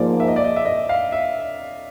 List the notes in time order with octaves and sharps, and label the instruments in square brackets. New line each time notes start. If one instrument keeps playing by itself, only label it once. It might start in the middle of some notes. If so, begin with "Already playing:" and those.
Already playing: [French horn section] G#2 F3 A#3 [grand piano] D5
[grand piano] E5
D#5
D5
D#5
E5
D#5
F5
E5